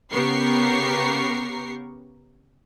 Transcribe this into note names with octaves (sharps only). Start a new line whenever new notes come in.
C#3 B3 G4 A#4 C#6 C7